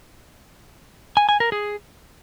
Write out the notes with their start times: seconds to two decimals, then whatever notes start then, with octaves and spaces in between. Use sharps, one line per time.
1.17 G#5
1.29 G#5
1.40 A#4
1.52 G#4